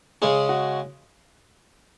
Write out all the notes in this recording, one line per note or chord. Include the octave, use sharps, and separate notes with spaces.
C#3 G#3 C#4 G#4
F#4